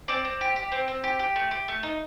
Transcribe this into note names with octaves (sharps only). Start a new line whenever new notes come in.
C4 D5 D6
C4
G4
G4
C4
C4
G4
G4
A3
G4
A3
D#4